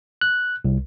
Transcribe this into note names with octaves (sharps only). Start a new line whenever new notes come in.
F#6
C2